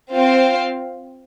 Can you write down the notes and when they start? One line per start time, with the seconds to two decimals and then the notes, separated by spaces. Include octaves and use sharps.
0.13 C4 F4 C5 F5